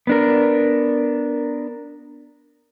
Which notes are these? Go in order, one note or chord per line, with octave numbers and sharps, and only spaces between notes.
B3 D4 A#4